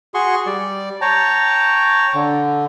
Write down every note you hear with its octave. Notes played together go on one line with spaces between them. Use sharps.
F#4 G#4 C6 C#6
G3 D5
C#5 G5 A5 A#5
D3